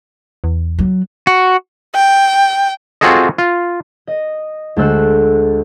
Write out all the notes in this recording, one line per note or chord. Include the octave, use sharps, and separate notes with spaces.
E2
F#3
F#4
G5
C4 F4 F#4 G#4 A4 D#5
F4
D#5
D2 G#3 A4 C5 E6 F#6